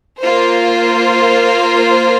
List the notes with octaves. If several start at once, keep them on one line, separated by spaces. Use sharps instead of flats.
A#3 F4 C5